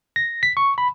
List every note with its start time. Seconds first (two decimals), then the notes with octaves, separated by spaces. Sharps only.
0.16 A#6
0.43 B6
0.57 C#6
0.78 B5